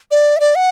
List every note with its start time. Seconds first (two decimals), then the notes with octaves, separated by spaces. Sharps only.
0.11 D5
0.36 E5
0.40 D5
0.55 F#5